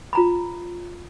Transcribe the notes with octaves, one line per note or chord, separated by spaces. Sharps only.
F4 A#5 B5